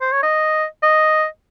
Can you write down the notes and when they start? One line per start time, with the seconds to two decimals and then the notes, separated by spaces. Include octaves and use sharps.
0.01 C5
0.12 C#5
0.23 D#5
0.83 D#5